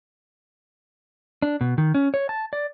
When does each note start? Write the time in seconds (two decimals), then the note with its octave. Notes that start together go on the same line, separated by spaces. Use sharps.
1.42 D4
1.61 B2
1.78 D#3
1.94 C#4
2.14 C#5
2.29 A5
2.53 D5